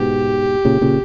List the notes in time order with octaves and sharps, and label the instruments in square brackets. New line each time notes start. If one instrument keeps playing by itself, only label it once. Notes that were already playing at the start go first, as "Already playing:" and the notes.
Already playing: [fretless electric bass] G#2 B2 [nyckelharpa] G4
[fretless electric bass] A#2 C#3
A#2 C#3